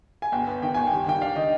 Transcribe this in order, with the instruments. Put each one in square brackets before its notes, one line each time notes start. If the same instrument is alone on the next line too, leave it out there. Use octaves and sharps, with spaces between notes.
[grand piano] G#5
[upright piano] G1 [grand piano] G5
[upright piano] B3
[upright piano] D#3 [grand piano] G5
[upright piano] G1 [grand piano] G#5
[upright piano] G3 [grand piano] G5
[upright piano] D#3 [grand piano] G5
[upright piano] D4 [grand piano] F5
[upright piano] D#3 [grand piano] D#5